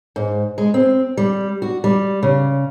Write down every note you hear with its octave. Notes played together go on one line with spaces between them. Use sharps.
G#2
G#3
C4
G3
F#4
G3
C#3